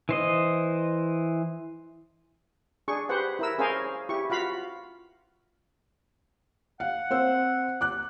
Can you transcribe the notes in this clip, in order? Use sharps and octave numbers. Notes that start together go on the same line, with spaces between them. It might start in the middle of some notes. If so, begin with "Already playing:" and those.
E3 C5 D#5
D4 G#4 C#6
G4 B4 C5 F#5
E4 A#4 E6
C#4 G#4 A#4 C5 F5 G#5
E4 G4 C#6
F4 F#4 F5 B5
F5 F#5
C4 C5 E6
D6 F#6